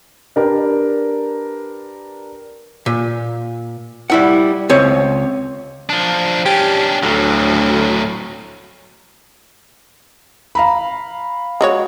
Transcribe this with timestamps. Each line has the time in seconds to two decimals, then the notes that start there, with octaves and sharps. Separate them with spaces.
0.36 D4 G4 A#4 B4 D5
2.86 A#2
4.10 G3 E4 F#5
4.69 C#2 C4 C#5
5.89 F3 D4
6.46 C#4 D4 G4
7.03 D2 A2 F#3
10.55 F5 A#5 B5
11.61 G#3 F#4 C#5